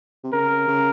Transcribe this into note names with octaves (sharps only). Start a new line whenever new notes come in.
C3
C#3 A#4
C#3